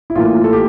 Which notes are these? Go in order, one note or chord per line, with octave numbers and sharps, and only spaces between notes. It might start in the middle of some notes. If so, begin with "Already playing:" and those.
E4
A2 E3 A#3 F4
A4
G4